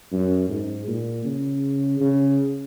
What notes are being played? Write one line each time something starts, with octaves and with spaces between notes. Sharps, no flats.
F#2
G#2
A#2
C#3
C#3